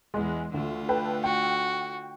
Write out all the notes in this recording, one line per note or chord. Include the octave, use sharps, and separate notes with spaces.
E2 G#3
D2 D3 A3 F4
A4 B4 G5
F#4 G5